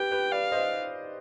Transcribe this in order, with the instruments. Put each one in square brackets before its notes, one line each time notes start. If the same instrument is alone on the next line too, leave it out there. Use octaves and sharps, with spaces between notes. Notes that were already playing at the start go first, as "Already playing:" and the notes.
Already playing: [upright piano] G4 B4 [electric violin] G5
[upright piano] G4 B4
[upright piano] B4 D5 [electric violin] F5
[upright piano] C5 D#5